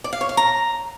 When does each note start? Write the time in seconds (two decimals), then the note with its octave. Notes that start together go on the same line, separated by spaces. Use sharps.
0.04 D5
0.13 F5
0.21 C#5
0.29 F5
0.37 A#5